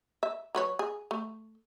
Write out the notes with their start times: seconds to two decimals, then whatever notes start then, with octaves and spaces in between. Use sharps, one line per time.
0.23 E5
0.55 F#3 B4 C#5
0.79 G#4
1.11 A3